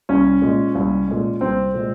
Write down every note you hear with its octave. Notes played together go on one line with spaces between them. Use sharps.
C2 C#4
A#2 G#3
C2
A#2 G#3
C2 C4
A#2 G#3